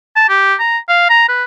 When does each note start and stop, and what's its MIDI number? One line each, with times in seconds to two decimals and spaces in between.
0.16 0.25 81
0.29 0.54 67
0.59 0.78 82
0.89 1.07 77
1.10 1.28 82
1.28 1.44 71